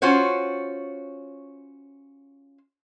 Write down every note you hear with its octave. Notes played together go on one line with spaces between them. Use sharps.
C#4 F4 F#4 C5 C#5